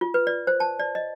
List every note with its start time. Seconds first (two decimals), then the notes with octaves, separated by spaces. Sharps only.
0.01 F4
0.14 B4
0.27 D5
0.47 C5
0.60 A5
0.79 D5
0.95 D#5